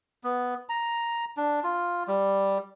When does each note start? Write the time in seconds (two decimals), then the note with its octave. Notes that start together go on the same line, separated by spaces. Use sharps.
0.24 B3
0.69 A#5
1.37 D4
1.64 F4
2.08 G3